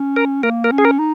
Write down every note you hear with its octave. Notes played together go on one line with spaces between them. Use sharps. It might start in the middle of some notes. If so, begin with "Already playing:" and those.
Already playing: C#4
A#4
A#3 A#4
A#4
C#4
G#4
A#4
D#4